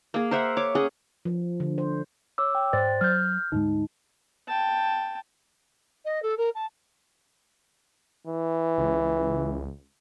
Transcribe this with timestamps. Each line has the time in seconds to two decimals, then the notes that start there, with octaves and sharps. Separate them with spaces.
0.14 A#3 G#4
0.31 A#4 C5 E5 F#5
0.57 C#5 D6
0.75 C#4 G#4 F#5
1.25 F3
1.60 D3
1.78 C5
2.38 C#5 D6 E6
2.55 G5
2.73 G#2 C5 D5 A6
3.01 F#3 F6 G6
3.52 D2 G#2 G#3 D#4
4.48 G5 A5
6.05 D#5
6.22 A4
6.37 A#4
6.55 A5
8.27 E3
8.78 C#2